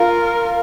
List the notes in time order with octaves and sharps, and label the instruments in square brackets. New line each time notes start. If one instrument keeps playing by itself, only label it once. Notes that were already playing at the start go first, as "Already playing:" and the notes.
Already playing: [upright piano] F4 [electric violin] A#4